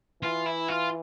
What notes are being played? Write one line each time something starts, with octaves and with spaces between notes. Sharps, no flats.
E3 F4
E4
F4